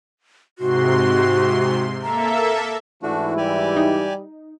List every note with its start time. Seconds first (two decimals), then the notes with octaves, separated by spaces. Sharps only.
0.59 G#2 C3 F#4 C6
2.02 A#3 A4 E5 A#5
3.03 G#2 E3 A3 D4 E4 F#4
3.37 G3 G4 D5 G#5
3.77 D#4